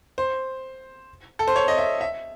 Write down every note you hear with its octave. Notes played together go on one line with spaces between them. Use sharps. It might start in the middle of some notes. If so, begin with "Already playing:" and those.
C5
A4
C5
C#5
D#5
E5
E5